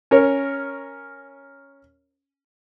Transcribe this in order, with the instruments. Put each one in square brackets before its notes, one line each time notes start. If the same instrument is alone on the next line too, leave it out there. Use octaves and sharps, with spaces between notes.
[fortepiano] C#4 A#4 C#5